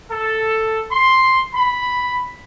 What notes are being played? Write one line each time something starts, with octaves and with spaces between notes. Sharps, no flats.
A4
C6
B5